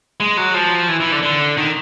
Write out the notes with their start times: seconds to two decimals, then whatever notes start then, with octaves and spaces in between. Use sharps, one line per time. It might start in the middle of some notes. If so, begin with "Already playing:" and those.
0.20 G#3
0.37 F#3
0.54 F3
0.88 E3
1.00 E3
1.12 D3
1.23 D3
1.57 D#3